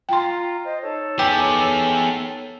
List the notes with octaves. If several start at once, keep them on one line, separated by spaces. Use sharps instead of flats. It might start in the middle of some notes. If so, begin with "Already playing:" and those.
F4 G5 A#5 C6
C5 D#5
D#4 A4 C#5
B3 G4 G#4